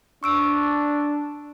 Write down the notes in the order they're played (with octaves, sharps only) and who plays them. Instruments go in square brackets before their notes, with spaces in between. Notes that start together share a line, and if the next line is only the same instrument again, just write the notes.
[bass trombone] D4 [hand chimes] C#6 E6 D7